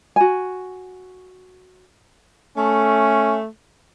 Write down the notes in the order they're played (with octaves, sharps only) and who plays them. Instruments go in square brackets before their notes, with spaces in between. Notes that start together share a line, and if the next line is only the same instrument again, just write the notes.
[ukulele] F#4 G#5
[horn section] A3 [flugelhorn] C#4